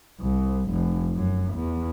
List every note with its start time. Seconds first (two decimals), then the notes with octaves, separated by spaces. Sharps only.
0.20 C2
0.70 F1
1.16 F#2
1.53 E2